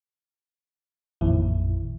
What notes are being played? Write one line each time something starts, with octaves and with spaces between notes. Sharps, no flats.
A1 F2 A#2 D#3 E4